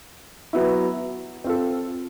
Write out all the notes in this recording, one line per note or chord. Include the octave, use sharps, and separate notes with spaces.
F#3 B3 E4
C4 F4 A4